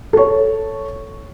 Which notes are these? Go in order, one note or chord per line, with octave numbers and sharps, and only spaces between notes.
A4 C#5